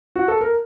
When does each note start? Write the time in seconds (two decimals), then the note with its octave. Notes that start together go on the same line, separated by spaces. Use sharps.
0.16 F#4
0.28 A4
0.41 A#4